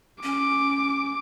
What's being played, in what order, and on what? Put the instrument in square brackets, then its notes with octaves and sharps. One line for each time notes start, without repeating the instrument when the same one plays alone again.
[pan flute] C#4 [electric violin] D6